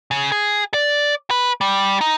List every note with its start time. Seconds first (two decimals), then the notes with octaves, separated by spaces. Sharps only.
0.11 C#3
0.32 G#4
0.74 D5
1.31 B4
1.61 G3
2.01 D#4